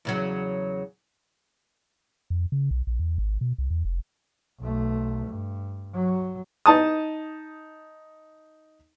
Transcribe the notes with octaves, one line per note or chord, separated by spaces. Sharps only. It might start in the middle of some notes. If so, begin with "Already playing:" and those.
E2 C#3 F#3
F2
C#3
B1
A#1
E2
G#1
B2
C2
E2
F1
B1 A3
G2
F#3
D#4 A5 D#6